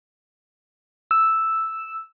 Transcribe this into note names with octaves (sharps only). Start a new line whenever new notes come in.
E6